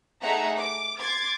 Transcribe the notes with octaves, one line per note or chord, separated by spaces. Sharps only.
A3 D#4 G#4 E5 F#5 A#5
D6
C6 D6 G#6 A6